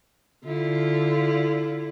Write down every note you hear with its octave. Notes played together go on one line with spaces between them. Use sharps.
D3 E4 F4